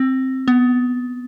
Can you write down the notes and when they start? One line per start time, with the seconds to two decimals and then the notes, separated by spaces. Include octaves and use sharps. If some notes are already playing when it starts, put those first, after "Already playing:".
Already playing: C4
0.48 B3